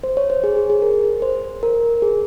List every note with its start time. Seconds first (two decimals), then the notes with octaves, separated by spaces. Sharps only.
0.04 C5
0.17 C#5
0.30 C5
0.44 G#4
0.57 G#4
0.70 G#4
0.82 A#4
1.22 C5
1.63 A#4
2.02 G#4